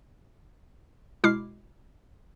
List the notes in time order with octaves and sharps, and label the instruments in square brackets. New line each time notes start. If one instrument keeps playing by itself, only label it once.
[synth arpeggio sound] B2 G#3 E4 D6 F6 C7